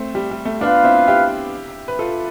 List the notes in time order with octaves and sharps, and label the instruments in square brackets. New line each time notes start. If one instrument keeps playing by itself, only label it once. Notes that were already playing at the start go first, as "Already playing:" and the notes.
Already playing: [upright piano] A3 C4
G3
G3
A3
[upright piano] B3 D4 [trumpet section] F4 B4 F5
[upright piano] C4 E4
E4 G4
B4
F4 A4